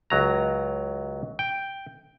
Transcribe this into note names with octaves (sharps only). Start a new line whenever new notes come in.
C#2 F#3 A#5
G5